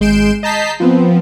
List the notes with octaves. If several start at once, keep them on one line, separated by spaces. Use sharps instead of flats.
G#1 G#3 G6 C7 D7 E7
D#5 A5 A#5 G6 B6 C7
F3 B3 C4